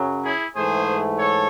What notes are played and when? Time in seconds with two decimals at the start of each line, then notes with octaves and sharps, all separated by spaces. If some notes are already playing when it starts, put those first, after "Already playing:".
Already playing: F#2 C#3 F#3
0.25 E4 G#4
0.56 G#2 E3 A3 G#4 C5
1.19 A4 C#5